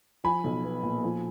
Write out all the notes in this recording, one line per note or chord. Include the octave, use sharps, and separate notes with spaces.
F3 G#5 B5
B1
B3
A#2
F3